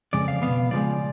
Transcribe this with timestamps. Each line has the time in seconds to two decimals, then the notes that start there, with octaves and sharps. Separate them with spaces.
0.13 F2 C#3 G#3 D5
0.28 F5
0.42 B2 G#3 B3 F5
0.71 C#3 F3 G#3 D5